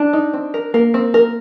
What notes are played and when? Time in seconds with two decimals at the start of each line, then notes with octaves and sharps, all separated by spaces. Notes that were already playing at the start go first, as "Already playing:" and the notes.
Already playing: D4
0.13 D#4
0.33 C4
0.54 A#4
0.74 A#3 A#4
0.94 C4
1.14 A#4